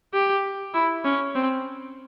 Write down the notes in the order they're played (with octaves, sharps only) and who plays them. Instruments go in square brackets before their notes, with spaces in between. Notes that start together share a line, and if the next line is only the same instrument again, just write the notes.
[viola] G4
E4
C#4
C4